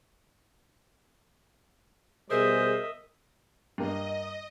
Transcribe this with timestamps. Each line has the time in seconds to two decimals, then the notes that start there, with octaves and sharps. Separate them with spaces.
2.30 B2 G3 G#4 A#4 C5 D#5 E5
3.78 G2 A#3 D#5